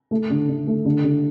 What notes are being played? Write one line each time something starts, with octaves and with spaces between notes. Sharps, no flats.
A3
D3
D3
A3
D3
D3